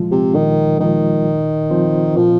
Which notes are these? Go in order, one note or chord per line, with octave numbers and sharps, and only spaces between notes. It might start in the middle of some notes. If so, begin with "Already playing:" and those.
Already playing: A#2 F3 G#3 F4
C3
A#2 D#3
D#3 F3 G#3 F4
A#2
F3 C4 F4 C5
A#2 F3